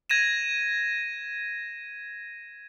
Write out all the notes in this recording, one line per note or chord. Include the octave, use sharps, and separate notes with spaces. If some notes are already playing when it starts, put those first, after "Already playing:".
G#6 A#6 D#7 E7